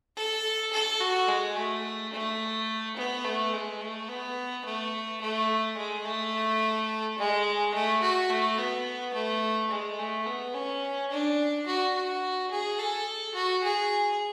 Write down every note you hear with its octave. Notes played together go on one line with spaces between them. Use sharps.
A4
A4
F#4
G#3
A3
A3
B3
A3
G#3
A3
B3
A3
A3
G#3
A3
G#3
A3
F#4
A3
B3
A3
G#3
A3
B3
C#4
D4
F#4
F#4
G#4
A4
F#4
G#4